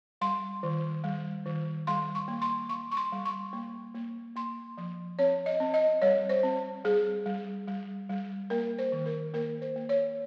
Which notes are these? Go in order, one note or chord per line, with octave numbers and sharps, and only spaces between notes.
G3 C6
D#3
G3
D#3
G3 C6
C#6
A#3
C6
G3 C#6
C#6
C6
G3
C#6
A#3
A#3
A#3 C6
F3
C4 C#5
D#5
C4
D#5
G3 C#5
C5
C4
G3 G#4
G3
G3
G3
A#3 A#4
C5
D#3
A#4
A#3 A#4
C5
A#3
C#5